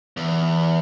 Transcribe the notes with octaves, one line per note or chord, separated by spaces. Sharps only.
E2